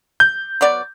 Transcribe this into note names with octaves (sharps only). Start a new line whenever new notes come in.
G6
F#3 B3 D5